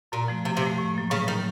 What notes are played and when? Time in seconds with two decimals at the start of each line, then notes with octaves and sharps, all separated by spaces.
0.12 F#2 A#2
0.28 F3 A3
0.45 F#2 C3
0.57 C3
0.62 F3 A3
0.78 A2
0.95 F#3 A#3
1.11 A2 C#3
1.28 D#3 F#3 A#3